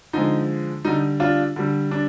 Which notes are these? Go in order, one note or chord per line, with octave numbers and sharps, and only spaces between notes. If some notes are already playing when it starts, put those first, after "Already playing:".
D3 F3 G#3 D#4
D3 G3 D#4
D4 F4
D3 G3
D4